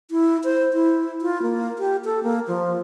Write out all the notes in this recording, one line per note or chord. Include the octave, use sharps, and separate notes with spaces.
E4
C5
E4
F4
A#3
G4
A4
A#3
F3